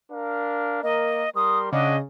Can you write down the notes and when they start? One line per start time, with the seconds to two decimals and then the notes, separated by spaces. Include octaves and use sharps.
0.11 D4 A#4 F5
0.83 A#3 A#4 D#5
1.36 G3 A#4 C6 D#6
1.72 C#3 D4 D#5 F#5 D6